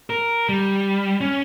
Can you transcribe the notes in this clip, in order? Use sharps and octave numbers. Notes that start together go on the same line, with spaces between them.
A#4
G3
C#4